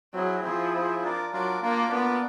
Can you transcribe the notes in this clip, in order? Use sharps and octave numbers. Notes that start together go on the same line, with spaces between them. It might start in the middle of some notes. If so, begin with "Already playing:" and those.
F#3 C4 E4 G#4
F3 C4 E4 G#4
C4 E4 G#4
D4 F4 A#4 D5
F#3 D4 F4 A#4 D5
A#3 D4 F4 A#4 D5
B3 D4 F4 A#4 D5